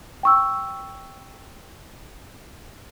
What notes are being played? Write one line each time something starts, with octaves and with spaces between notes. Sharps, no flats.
G5 C#6 E6